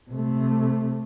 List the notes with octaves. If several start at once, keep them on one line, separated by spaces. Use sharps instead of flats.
C3 A3